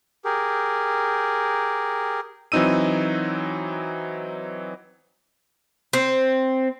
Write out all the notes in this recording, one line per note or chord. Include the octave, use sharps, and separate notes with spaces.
G4 G#4 A#4
E3 F#3 C4 D#4 E6 D#7
C4